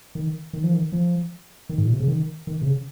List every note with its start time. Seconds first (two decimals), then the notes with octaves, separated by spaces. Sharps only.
0.15 D#3
0.53 D#3
0.64 F3
0.74 D#3
0.92 F3
1.69 D#3
1.78 G#2
1.86 A#2
1.93 C3
2.00 C#3
2.08 D#3
2.47 D#3
2.62 C3
2.66 C#3